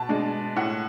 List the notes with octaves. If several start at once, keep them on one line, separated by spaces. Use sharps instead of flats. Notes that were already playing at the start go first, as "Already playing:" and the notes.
Already playing: B2 A5
G#3 D4
A2 F#5